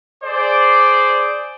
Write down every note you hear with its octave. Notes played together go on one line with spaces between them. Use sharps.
G#4 C5 D5